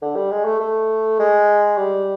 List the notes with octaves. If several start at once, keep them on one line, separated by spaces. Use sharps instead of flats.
D3
G3
G#3
A3
A3
G#3
G3